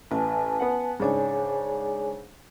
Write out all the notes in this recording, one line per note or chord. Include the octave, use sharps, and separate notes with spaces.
A1 B4 G#5 A5
B3 F#5
G#2 C#3 D4 G#4 C#5 G#5